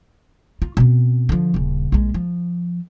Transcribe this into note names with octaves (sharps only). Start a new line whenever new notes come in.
F4
B2 C4
D3 F3
D#1 C#3
A#1 G#3
F3